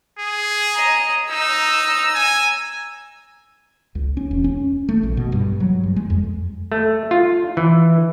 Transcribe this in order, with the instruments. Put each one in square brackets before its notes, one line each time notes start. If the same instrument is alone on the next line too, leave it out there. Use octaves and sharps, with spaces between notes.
[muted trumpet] G#4
[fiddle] D#5 A#5
[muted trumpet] D#4 [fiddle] A#5 E6
[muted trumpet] G#5
[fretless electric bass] C#2
C#4
E1
C#4
A3
A#1
B2
G2
F#3
G2
G#3
F2
[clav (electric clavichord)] A3
F4
E3